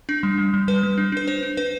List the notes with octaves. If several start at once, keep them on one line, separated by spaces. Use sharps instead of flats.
D4
G3
G3
G3
G3 B4
G3
D4
D4 B4
D4 C5
D4
D4 B4